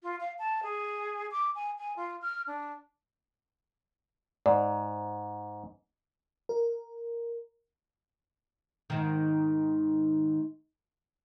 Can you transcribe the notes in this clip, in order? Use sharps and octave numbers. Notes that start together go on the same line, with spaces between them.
F4
F5
A5
G#4
D6
G#5
G#5
F4
F6
D4
G#2 D5
A#4
G#2 D#3